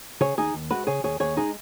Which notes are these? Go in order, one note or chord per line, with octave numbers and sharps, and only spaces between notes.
C#3 G#4 C#5
D#2 D#4 G#4
D#2
G#3 F#4 B4
C#3 G#4 C#5
D#2 G#4 C#5
D#2 G#4 C#5
G#3 D#4 G#4